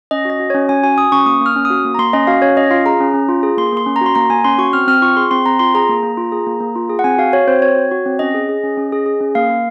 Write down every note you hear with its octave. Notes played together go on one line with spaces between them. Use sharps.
C#4 D#5
F#4 D#5
F#4
C#4 C#5
C#4 G#5
F#4 G#5
F#4 D#6
C#4 C#6
A#3 D#6
A#3 F6
C#4
D#6
F#4
A#3
A#5
A#3 C6
C#4 D#5
F#4 F5
C#4 C#5
C#4 D#5
F4 F5
G#4 A#5
C#4
C#4
F4
G#4
A#3 C6
A#3 C6
C#4
A#5
F#4 C6
A#3 A#5
A#3 G#5
C#4 C6
F#4 C#6
C4 F6
C4 F6
F4 C#6
G#4 C6
C4 C6
C4 A#5
F4 C6
G#4 A#5
A#3
A#3
F4
G#4
A#3
A#3
F4
G#4
F#5
C4 G#5
F#4 F5
F#4 C#5
C4 C5
C4 C#5
F#4
F#4
C4
C#4 D#5
G#4
G#4
C#4
C#4
G#4
G#4
C#4
A#3 F5
A#3